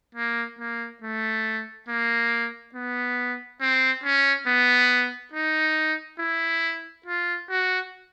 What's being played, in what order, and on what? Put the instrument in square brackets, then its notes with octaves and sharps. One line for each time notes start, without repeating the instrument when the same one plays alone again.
[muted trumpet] A#3
A#3
A3
A#3
B3
C4
C#4
B3
D#4
E4
F4
F#4